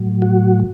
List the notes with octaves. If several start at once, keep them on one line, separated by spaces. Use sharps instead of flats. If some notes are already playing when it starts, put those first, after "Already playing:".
Already playing: A2 F#3
F#4